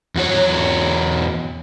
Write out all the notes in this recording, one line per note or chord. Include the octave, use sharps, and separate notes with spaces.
E2 F#4 C#5